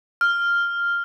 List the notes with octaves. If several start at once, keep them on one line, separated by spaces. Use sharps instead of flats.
F6